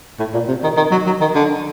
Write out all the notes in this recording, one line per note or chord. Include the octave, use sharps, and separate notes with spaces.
A2
A#2
C3
D#3
D#3
F#3
F#3
D#3
D3